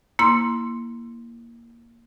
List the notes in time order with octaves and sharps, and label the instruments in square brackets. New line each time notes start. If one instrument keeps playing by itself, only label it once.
[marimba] A#3 E4 C6